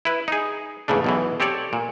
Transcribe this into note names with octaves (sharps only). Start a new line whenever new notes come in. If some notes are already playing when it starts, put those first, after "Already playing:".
E4 B4
D#4 G#4
E2 G#2 C#3 A3 D4
B1 B2 E3
C4 G4 A4 C#5 D5
A#2